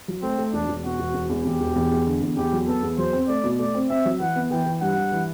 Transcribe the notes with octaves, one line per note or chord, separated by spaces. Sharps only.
F#3
A3 C4
A3
E1 D4
E1
B2 F#4
E1
E1
E2
E2 G4
E1
E2
E2
D3
E2
E2 G4
F#3
B3 A4
E2
F#3 C5
C4
A3 D5
B2
A3 D5
C4
C4 E5
F#3
E3 F#5
B3
E3 G5
E3
G2 F#5
G2
E3